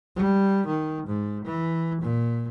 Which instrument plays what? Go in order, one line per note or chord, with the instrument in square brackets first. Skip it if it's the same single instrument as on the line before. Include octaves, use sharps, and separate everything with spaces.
[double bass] G3
D#3
G#2
E3
A#2